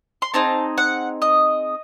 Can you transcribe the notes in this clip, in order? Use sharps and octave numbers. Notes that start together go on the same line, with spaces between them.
C6
C4 D#4 G#4 A5
F#5
D#5